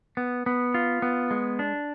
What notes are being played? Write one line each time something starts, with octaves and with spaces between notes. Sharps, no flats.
B3
B3
F4
B3
G#3
D4